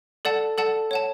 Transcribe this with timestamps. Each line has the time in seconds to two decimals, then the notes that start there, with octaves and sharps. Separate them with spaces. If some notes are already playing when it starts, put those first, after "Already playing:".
0.25 A4 D5 F#5 A5
0.58 A4 D5 F#5 A5
0.91 C#5 F#5 A5